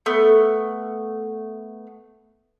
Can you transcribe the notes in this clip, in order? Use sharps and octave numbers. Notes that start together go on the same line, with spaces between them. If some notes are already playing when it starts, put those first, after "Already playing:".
A3 B3